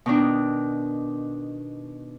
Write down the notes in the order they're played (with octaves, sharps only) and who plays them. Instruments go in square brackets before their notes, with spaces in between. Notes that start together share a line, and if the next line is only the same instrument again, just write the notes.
[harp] B2 D#3 D4